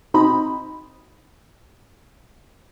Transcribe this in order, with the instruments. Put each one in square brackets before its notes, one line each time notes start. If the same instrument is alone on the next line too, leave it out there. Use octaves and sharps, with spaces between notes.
[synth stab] B2 C4 D#4 C5 D#5 B5